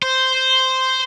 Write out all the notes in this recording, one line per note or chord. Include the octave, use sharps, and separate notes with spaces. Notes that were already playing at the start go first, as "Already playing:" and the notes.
C5